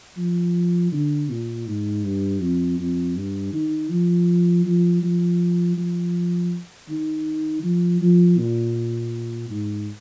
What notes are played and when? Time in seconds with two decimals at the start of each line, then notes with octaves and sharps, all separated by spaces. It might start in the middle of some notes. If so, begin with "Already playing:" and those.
0.17 F3
0.92 D3
1.30 A#2
1.67 G#2
2.04 G2
2.41 F2
2.78 F2
3.16 G2
3.53 D#3
3.90 F3
4.65 F3
5.03 F3
5.77 F3
6.89 D#3
7.63 F3
8.01 F3
8.38 A#2
9.50 G#2